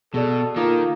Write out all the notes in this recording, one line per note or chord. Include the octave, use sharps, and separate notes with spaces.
B2 G#4 A4 D5
D#3 A#3 F4 A4 D#6